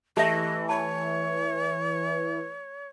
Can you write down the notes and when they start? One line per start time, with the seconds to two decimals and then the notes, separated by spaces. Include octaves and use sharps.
0.17 E3 A3 G4 D#5 E5
0.69 C#5 A5